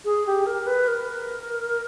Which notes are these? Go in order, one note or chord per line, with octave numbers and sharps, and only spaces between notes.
G#4
G4
A#4
B4
A#4